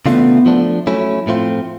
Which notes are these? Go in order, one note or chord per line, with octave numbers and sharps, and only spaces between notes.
C#3 E3 A3 B3 D4 F4
F3 A3 D4
F#3 A3 C#4 E4
A2 F3 A3 C4 F4